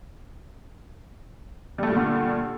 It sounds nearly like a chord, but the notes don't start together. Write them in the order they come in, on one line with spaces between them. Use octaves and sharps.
G3 A3 G2 A#2 D3